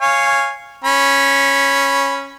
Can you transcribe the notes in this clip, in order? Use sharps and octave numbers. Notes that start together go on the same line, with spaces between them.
C#5 F5 G#5
C#4 B5